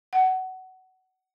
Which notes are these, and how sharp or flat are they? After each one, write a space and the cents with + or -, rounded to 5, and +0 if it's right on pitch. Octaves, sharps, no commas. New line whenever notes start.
F#5 +20